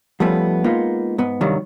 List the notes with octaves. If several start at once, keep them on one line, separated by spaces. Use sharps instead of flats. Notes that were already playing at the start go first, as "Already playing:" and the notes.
F3 G3 A3 B3 C#4
G#3 A#3 B3 D#4 F4
G#2 B3
C2 G2 D#3 F#3 G3